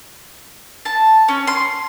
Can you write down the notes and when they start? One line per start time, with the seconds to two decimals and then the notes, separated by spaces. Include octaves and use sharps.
0.85 A5
1.28 C#4
1.47 C6